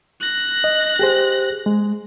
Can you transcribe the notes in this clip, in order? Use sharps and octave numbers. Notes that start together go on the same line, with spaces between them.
F#6 A#6
D#5
G4 G#4 C5
G#3